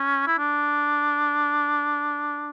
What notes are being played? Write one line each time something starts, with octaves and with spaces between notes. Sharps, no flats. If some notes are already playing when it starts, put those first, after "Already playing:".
Already playing: C#4
E4
D4